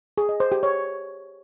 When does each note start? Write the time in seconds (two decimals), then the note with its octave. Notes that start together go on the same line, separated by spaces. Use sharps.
0.18 G#4
0.29 D#5
0.40 C5
0.52 G4
0.63 C#5